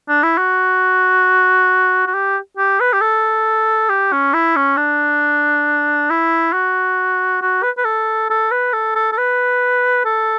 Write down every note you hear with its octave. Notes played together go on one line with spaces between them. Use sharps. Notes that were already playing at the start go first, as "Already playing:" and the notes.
D4
E4
F#4
F#4
G4
G4
B4
G4
A4
G4
C#4
E4
C#4
D4
E4
F#4
F#4
B4
B4
A4
A4
B4
A4
A4
A4
B4
A4